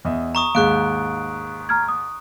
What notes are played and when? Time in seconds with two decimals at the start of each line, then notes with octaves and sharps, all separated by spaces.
0.05 E2 D#5 E5
0.35 A#5 C#6 D#6
0.55 D#2 G#2 G#4 F5 C#6 F#6 D7
1.69 A#5 F6 G#6
1.88 D#6